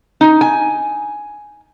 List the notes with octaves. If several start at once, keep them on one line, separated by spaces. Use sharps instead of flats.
D#4
G#5